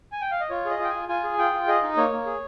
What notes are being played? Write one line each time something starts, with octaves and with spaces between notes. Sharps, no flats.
G#5
G5
F5
D#5
F4 C#5
G#4
D#5
F4 G5
F4 G#5
F4 G#5
G#4
F4 G5
F4
G#4 D#5
D#4
A#3 C#5
A#3
G#4